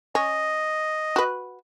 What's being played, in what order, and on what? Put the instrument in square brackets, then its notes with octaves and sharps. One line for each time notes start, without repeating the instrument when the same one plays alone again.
[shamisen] C#4 [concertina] D#5
[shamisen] F#4 B4